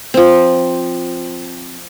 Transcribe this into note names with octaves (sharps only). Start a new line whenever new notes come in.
F3 C4